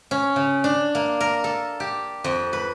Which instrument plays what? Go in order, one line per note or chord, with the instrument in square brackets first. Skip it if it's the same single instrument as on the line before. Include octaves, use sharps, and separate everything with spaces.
[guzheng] C#4
C#3
D4
A#3
A#4
A4
G4
F2
B4